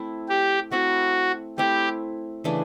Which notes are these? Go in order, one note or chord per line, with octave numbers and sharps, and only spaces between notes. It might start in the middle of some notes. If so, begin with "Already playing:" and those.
Already playing: A3 C4 E4
G4
A3 C4 E4 F#4
A3 C4 E4 G4
C#3 E3 A3 D4